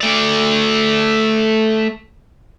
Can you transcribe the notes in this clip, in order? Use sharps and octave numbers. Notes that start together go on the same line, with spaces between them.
A3 D5